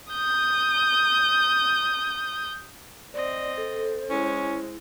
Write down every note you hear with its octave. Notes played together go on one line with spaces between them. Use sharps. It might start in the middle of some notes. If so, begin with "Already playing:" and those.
D#6 G6
C4 C5 D5 D#5
A4
G#3 C#4 E4